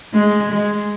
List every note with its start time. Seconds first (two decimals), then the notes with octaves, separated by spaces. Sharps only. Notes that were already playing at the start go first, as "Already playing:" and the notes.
0.14 G#3
0.52 G#3